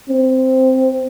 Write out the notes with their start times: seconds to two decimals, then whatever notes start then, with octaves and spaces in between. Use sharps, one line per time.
0.09 C4